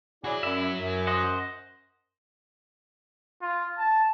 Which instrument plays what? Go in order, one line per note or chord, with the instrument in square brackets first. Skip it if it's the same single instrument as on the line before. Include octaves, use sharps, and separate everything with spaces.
[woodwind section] E4 G#4 D5 [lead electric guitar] F#4 C#5
[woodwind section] F#2 [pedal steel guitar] E4 E5
[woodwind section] F#2
[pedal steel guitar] C5 D#5 F#5
[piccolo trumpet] F4
A5